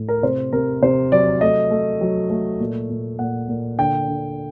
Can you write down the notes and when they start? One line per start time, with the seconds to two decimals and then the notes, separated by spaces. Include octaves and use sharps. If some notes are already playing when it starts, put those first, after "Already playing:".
Already playing: A2
0.09 A#4
0.23 C3 C5
0.53 C3 A#4
0.82 C3 C5
1.12 F#3 D5
1.41 A3 D#5
1.71 A3
2.01 F#3
2.30 A3
2.60 A#2
2.90 A#2
3.19 A#2 F#5
3.49 A#2
3.78 D3 G5
4.08 D3